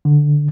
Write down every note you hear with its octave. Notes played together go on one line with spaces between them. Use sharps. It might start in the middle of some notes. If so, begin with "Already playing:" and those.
D3